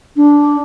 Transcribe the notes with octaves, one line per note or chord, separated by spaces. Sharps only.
D4